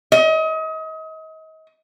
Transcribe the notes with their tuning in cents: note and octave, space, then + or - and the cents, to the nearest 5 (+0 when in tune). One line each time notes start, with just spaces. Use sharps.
D#5 +35